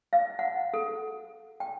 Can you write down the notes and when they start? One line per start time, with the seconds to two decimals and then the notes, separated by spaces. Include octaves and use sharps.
0.13 F5
0.39 F#5
0.74 A4
1.60 G5